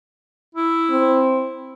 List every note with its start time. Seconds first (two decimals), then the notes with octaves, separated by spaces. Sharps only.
0.55 E4
0.91 C4